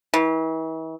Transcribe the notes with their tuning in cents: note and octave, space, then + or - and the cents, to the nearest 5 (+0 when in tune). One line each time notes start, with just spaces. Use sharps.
E3 -40